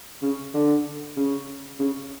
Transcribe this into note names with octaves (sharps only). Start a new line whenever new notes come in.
C#3
D3
C#3
C#3